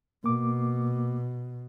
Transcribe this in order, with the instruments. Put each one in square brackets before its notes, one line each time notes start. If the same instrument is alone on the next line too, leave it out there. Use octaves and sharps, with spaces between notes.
[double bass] B2 [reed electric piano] A#3 D6